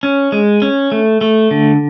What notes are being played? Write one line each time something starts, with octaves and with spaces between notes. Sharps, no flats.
C#4
G#3
C#4
A3
A3
D3